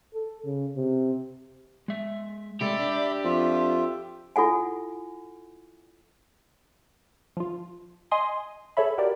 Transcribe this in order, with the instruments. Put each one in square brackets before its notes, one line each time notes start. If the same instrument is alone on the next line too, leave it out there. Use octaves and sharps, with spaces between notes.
[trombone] A4
C#3
C3
[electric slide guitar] G#3 E5
[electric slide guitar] C3 G#3 A3 [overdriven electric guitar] G4 [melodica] D5 E5 B5
[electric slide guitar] D4
[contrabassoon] F2 [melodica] F4 E5
[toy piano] E4 F4 A4 F#5 G#5
[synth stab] F3 F4
D#5 G#5 C6 D#6
G#4 A4 C#5 E5 B5
F#4 G4 A#4 D5